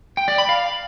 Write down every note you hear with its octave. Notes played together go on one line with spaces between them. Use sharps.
G5
D5
B5
F5